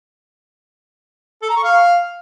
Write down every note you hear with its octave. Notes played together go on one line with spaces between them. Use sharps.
A4
A#5
C#6
F5